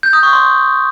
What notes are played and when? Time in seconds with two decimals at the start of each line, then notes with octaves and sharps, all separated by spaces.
0.03 G6
0.13 D#6
0.23 C#6
0.33 C6